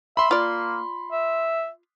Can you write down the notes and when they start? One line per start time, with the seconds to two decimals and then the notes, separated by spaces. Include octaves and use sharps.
0.17 E5 B5 C6
0.31 A#3 F4 D5
1.12 E5